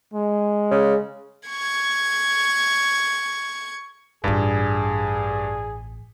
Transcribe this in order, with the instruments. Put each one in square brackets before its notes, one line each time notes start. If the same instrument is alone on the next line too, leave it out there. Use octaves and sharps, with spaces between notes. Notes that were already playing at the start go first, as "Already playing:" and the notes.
[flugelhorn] G#3
[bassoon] C#3
[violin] C#6 G#6
[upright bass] A1 F4 [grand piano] G2 [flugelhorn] G#4